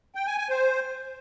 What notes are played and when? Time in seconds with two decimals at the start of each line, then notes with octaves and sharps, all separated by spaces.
0.15 G5
0.26 G#5
0.38 G#5
0.49 C5